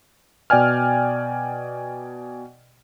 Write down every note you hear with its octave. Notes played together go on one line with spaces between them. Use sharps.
B2 D5 G5 G#5 F6